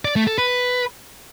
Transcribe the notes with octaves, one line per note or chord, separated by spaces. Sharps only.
D5
A3
A4
B4